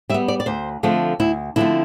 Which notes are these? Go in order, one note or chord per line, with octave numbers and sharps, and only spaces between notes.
G3 B3 E5
D5
D5
D2 C5
D3 F3 A3 C4
D2 E4
D3 F3 A3 C4 E4